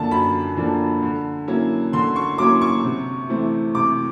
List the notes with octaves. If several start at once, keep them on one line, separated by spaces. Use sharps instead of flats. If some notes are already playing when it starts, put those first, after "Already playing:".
Already playing: F#2 D3 F3 A#3 D4 A5
F#2 B5
D3 F3 A#3 D4
D3
F#3 A#3 C#4 E4
D3 C6
C#6
F#3 A#3 C#4 E4 D6
C#6
C3
E3 A3 C4
C3 D6